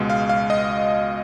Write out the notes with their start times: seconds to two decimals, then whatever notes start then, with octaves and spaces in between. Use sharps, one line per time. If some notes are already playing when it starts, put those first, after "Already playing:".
Already playing: C#2 B2 G#3
0.10 F5
0.29 F5
0.50 D#5